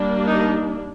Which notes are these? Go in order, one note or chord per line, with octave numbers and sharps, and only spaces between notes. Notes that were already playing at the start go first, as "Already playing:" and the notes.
Already playing: G3 A#3 D4
D#4